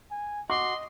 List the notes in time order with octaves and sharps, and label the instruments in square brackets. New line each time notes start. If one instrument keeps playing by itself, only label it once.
[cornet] G#5
[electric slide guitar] F#4 [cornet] D#5 [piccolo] C6 [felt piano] D6